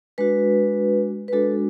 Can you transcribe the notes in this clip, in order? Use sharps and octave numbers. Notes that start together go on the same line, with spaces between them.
G#3 D4 F#4 B4
B4
G#3 D4 F#4 A4